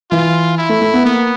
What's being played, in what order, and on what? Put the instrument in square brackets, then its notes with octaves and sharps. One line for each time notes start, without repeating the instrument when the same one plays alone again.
[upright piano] E3 [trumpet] F4
[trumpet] E4
[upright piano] A3
A3
B3
[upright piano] A#3 [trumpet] B3